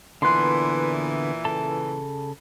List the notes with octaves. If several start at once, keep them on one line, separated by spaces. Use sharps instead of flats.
A#2 D3 E3 B3 C6 F#6 C7
C#3 A4 A5